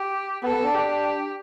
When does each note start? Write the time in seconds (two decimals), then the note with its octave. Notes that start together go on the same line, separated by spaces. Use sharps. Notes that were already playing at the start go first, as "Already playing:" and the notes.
Already playing: G4
0.43 B3 A4
0.54 B3
0.64 D4
0.74 G4